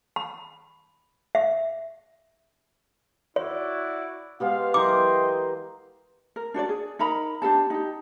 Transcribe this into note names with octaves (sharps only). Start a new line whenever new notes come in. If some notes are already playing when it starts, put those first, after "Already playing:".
B5
E5
E4 F#4 C#5 D5
G#3 B3 G4 C5 F5
E3 A#4 D#5 F5 G5 C6 D6
A#4
D4 F#4 C#5 D5
G#4
D#4 A#4 A#5 B5
D4 G4 A4 A5
D#4 G4